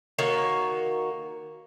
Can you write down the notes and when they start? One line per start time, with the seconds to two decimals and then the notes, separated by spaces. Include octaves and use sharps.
0.19 D#3 A#3 F#4 C#5